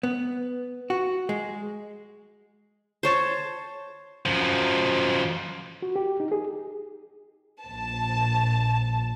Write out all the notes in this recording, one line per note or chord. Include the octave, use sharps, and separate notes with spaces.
B3
F#4
G#3
C5 C#5 A5
F#2 F3
F#4
G4
D#4
G#4
A#1 A5